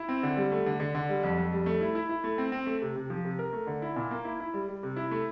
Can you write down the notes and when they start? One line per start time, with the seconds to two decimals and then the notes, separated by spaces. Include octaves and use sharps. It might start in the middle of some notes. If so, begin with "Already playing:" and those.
Already playing: E4
0.09 C4
0.23 D3
0.37 G3
0.52 A3
0.66 D3
0.80 D3
0.95 D3
1.09 G3
1.23 F2
1.38 F2
1.53 G3
1.66 A3
1.81 E4
1.95 E4
2.09 E4
2.24 A3
2.38 C4
2.52 C4
2.66 A3
2.82 C3
2.96 C3
3.10 F3
3.25 C3
3.39 A#4
3.53 A3
3.67 D3
3.82 E4
3.96 A#2
4.11 A#3
4.25 E4
4.40 E4
4.54 G3
4.69 G3
4.83 C3
4.96 E4
5.11 A3